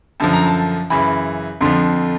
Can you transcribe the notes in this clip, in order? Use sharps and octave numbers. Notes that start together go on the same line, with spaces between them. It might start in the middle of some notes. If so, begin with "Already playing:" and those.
F#2 D3 F3 A5
A#5
A5
F#2 C#3 E3 B5
F2 D3 F3 C6